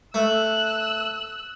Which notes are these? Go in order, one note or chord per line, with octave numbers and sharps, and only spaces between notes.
A3 E6 F#6